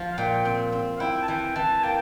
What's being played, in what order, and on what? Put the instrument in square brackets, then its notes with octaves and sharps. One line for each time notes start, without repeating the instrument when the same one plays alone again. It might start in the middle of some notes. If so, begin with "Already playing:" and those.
Already playing: [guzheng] F3
[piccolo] F5
[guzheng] A#2 [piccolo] G5
[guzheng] C4
C4
[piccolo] F5
[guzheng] E4 [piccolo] G5
[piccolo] A5
[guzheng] E3 [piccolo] G5
[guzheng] E3 [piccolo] A5
[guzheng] A#3 [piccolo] G5